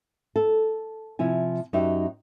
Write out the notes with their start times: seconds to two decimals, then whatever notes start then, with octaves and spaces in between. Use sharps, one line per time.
0.36 A4
1.19 C3 F3 E4 G#5
1.73 F#2 D#4 F#4 G4 E5